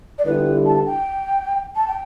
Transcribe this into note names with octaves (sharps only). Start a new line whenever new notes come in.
D5
G1 G2 D3 G3 E4 B4
A5
G5
A5
G5